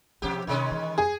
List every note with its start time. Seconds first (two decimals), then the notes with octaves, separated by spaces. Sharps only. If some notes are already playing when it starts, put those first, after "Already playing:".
0.22 B2 F3 C#4 G4
0.47 C3 D#3 G#3 C#4
0.71 E3
0.98 F2 G#4